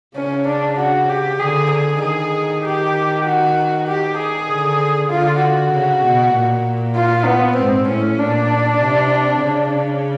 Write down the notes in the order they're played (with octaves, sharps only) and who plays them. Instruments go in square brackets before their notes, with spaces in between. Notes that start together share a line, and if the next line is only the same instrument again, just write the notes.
[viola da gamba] C#3 [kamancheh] C#4
[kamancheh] D4
F#4
G4
[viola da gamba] D3 [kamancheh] G#4
[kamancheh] G#4
[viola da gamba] D#3 [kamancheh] G#4
[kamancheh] G4
F#4
G4
G#4
[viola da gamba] D3
[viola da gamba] D3 [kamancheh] F4
[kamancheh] F#4
[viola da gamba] C#3
B2
A#2
[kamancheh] F4
B3
[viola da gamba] G#2 [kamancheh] C4
[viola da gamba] A2 [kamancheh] C#4
[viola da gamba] A#2 [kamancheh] D4
[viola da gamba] C3
C#3